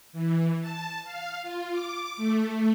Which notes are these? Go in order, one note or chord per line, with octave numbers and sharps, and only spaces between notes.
E3
A5
F5
F4
D6
A3